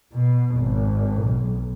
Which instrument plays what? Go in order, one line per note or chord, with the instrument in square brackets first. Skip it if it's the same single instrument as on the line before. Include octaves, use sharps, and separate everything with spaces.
[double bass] B2
G#1
B1